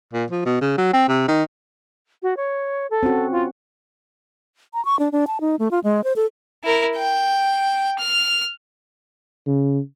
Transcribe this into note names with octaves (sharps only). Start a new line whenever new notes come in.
A#2
F3
B2
C#3
F#3
C4
C3
D#3
F#4
C#5
A4
C4 C#4 F#4
F4
A#5
C#6
D4
D4
A5
D#4
A3
F4
G#3
C5
A4
E4 A#4
G5
F6
C#3